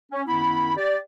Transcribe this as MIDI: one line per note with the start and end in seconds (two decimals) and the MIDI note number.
0.12 0.22 61
0.27 0.73 42
0.27 0.73 51
0.27 0.73 59
0.27 0.73 64
0.27 0.73 83
0.77 0.99 67
0.77 0.99 74